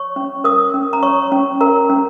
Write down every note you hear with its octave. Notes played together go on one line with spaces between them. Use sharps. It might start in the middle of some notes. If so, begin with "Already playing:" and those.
Already playing: C#5 C#6
C#4
A#4 D#6
C#4
A#5
C#5 C#6
C#4
A#4 A#5
C#4